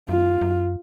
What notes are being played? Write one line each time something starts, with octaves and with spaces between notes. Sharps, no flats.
F#2 F4
F#2